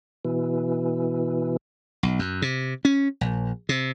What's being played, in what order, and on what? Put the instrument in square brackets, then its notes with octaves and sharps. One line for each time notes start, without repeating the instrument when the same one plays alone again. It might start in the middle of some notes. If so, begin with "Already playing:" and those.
[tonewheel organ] B2 E3
[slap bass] B1
F#2
C3
C#4
A#1
C3